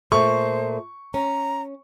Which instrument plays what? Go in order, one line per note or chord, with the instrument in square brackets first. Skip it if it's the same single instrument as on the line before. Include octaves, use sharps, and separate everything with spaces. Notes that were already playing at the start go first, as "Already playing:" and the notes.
[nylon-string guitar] A#2 A3 [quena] C5 [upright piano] C#6
[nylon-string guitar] C#4 [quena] A#5